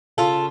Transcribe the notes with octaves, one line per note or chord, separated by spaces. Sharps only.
C#3 F4 A4